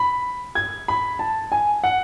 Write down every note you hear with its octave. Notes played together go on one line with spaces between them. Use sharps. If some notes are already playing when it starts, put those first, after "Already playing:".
Already playing: B5
G#6
B5
A5
G#5
F#5